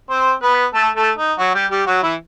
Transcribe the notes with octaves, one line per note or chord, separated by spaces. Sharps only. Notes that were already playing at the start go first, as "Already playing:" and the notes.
C4 C5
B3 B4
A3 A4
A3 A4
D#4
F#3 F#4
G3 G4
G3 G4
F#3 F#4
E3 E4